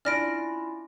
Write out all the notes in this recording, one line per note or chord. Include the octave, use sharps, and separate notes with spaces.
C#4 D4 E4 F4 F6 A#6 D7